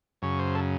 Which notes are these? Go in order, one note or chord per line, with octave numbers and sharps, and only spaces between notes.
F#2 C#3 C#5
C5
A4